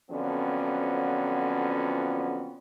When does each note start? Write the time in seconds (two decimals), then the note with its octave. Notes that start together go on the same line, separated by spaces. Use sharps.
0.10 F2 D3 F3 F#3 B3 C#4